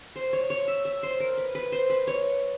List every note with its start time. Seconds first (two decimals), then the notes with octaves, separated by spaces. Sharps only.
0.16 C5
0.33 C#5
0.50 C#5
0.68 E5
0.85 E5
1.03 C5
1.20 A#4
1.37 B4
1.55 B4
1.72 C5
1.90 B4
2.07 C#5